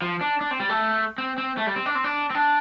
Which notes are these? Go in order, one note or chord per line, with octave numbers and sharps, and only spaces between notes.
F3
D4
D4
C4
G3
A3
C4
C4
A3
G3
C4
D4
C4
D4
C4
D4